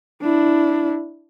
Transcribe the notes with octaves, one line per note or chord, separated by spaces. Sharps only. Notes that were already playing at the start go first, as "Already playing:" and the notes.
D4 E4